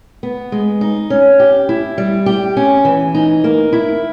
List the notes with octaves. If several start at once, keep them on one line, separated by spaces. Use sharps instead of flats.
B3
G#3
D#4
C#4
G4
E4
G3
G4
C#4
E3
D#4
A#3
E4